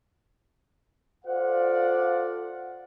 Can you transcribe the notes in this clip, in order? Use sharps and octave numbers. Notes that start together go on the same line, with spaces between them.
F4 A4 C5 D5 F5 F#5